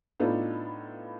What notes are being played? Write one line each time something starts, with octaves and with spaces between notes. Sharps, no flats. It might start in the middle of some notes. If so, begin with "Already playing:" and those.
A2 B3 D4 D#4 F4 A4